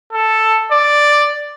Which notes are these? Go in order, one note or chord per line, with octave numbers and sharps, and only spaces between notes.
A4
D5